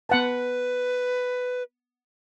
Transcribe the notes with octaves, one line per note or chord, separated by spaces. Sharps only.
B3 B4 F#5 A5